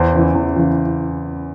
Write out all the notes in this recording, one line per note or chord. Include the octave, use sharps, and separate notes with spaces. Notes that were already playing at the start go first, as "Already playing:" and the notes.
Already playing: E2 C5
C#3 E3
E2
C#3 E3